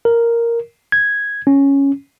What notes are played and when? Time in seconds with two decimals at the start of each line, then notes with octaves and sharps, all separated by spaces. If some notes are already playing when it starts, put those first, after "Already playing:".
0.05 A#4
0.92 G#6
1.47 C#4